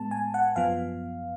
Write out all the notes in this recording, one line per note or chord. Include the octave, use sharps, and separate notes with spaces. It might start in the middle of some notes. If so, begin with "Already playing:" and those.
Already playing: A2 G#3 B3 A5
G#5
F#5
G#1 F#2 F3 B3 F5